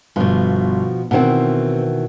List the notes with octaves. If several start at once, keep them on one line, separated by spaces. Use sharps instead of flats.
G1 B2 F3
B2 D#3 E3 C4 F#5